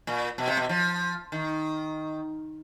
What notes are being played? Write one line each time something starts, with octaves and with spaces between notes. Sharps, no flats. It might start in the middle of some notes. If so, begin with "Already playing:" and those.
A#2
B2
C3
B2
F3
D#3